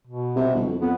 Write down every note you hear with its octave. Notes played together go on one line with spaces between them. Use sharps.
B2
C3
G1
F2
F2 B3